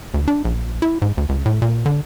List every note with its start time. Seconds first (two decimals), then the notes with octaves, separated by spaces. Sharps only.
0.14 D2
0.28 D4
0.45 A#1
0.82 E4
1.02 G#2
1.17 D2
1.29 C#2
1.46 A2
1.62 A#2
1.86 D3